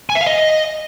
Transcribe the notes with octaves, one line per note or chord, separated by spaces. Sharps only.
G#5
E5
F5
D#5